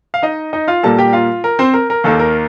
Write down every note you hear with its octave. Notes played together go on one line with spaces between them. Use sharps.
F5
D#4 D#5
D#4 D#5
F4 F5
A#2 G3 A#3 A4 A5
G4 G5
F4 F5
A#4
C4 C5
A#4
A#4
D#2 D#3 A#3 A4
A#4